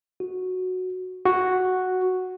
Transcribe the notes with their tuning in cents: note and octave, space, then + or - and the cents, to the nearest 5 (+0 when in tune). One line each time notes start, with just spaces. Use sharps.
F#4 -5
F#4 +0